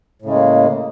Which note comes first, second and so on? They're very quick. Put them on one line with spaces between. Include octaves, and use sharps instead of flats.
A2 C#3 G#3 A#3